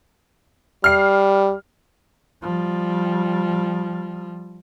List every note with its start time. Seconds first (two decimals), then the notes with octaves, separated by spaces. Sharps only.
0.84 G3 F6 C7
2.42 F3 G3